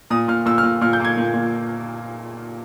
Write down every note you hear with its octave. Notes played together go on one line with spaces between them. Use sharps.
A#2 D#6
A#2 F6
A#2 E6
F6
A#2
A#2 F6
G6
A#3 G#6
A#2
A#2